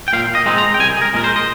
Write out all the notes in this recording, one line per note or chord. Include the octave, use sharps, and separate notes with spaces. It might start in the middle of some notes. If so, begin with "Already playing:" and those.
G5
A#2 F5
D#5
G#3 C4 D#4
A#5
G5
C2 G#5
G#4
A#4
A#2 G#3 A#4
C5
D#5